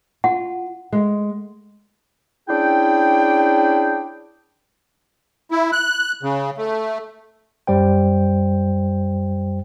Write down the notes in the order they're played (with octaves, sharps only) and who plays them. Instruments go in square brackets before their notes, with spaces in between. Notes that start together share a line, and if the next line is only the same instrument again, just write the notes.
[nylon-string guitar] F4 [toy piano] F#5
[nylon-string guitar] G#3
[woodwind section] C#4 D4 E4 G#4 G5
[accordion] E4
F#6
C#3
A3
[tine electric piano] F#2 G3 C5 G5